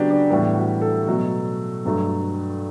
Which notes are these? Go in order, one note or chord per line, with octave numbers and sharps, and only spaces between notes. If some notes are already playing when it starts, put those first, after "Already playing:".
Already playing: C#3 F#3 B3 D4 F#4 G4
D4
A2 E3 G3 B3
F#4
A4
B2 F#3 A3
G2 F#3 A3